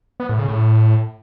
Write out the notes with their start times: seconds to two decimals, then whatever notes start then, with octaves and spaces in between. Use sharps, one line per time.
0.20 B3
0.29 A2
0.39 C#3
0.48 A2